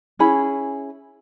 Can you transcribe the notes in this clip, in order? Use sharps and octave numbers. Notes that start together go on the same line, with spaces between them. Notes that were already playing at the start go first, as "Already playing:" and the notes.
C#4 E4 G#4 B5